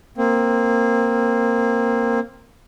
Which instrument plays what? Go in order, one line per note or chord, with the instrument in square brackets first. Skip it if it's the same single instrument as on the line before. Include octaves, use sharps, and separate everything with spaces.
[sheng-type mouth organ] A#3 C4